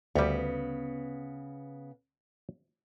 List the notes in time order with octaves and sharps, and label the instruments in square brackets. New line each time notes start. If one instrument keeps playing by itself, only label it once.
[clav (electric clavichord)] D2 G3 [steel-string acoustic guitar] C#3 B3